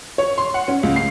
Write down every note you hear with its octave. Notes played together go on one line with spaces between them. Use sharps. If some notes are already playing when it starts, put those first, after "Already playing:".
C#5
C6
F#5
C#4
C#2
C7